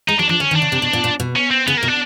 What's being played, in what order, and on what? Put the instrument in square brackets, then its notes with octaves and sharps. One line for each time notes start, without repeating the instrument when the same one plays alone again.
[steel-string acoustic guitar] G#3 [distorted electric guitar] D#4
[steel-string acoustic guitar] F#3 [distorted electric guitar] D4
[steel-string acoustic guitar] F3 [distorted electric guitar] D4
[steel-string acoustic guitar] D3 [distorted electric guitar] C#4
[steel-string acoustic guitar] D#3
[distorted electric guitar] D4
[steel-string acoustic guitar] C#3
C3
B2
A#2
A#2
B2
[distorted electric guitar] C#4
C4
[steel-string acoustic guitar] C#3 [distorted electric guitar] B3
[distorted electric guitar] A#3
[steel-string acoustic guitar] B2
[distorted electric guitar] D4